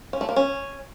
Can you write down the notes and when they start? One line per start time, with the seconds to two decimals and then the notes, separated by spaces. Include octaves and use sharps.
0.13 C#4
0.21 A3
0.29 A#3
0.36 C#4